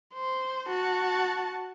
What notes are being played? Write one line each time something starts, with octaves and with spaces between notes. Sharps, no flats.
C5
F#4 A5